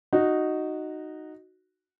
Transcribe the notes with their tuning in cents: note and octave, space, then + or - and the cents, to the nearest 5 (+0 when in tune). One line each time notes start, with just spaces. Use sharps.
D#4 -5 F#4 +0